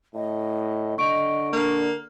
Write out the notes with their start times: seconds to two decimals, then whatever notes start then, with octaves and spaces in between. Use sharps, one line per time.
0.15 A2 D#5
0.98 D3 D#5 C#6 D7
1.53 A#3 D4